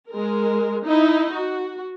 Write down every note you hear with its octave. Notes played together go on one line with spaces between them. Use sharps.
G#3 A#4
D#4 E4
F#4